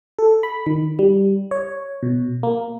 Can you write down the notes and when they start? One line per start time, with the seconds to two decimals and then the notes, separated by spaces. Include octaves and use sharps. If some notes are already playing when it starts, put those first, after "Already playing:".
0.19 A4
0.43 B5
0.66 D#3
0.99 G3
1.51 C#5
2.03 B2
2.43 A#3